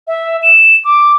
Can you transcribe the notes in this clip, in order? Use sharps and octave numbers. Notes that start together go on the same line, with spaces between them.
E5
E7
D6